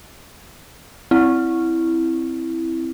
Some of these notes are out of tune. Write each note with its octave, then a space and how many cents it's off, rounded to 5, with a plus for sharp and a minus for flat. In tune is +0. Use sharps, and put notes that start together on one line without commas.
C4 +0 E4 +0